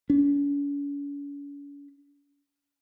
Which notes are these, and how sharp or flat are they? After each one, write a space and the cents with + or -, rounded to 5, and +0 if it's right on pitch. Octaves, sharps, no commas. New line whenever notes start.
C#4 +45